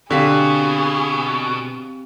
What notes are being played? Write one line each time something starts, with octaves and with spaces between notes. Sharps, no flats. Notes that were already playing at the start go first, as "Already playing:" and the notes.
B2 D3 C4 G4 G#4 F5 B6